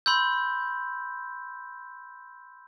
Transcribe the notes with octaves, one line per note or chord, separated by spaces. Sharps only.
B5 C6 E6 G6